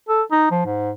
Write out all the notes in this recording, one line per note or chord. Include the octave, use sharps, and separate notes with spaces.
A4
D#4
F3
G#2